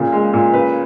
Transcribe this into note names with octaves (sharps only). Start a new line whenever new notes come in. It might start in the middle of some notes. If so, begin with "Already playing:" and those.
Already playing: A#2 C#3
G#3
A#2
C#3 B4